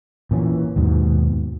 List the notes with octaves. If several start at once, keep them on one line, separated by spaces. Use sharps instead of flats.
A#2 E3 C#4
D#2 G#2 B2